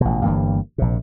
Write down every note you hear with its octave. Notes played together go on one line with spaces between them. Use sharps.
A1 B2
G1 G2 E3 A#3
A#1 C3